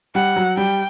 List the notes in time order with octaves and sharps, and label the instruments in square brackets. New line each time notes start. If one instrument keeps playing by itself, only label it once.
[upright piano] G3 [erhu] F#5
[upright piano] F#3
[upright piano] G3 [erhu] G5